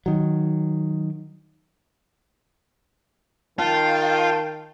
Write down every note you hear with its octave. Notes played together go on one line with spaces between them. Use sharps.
D#3 F#3
D#3 F4 G5 A5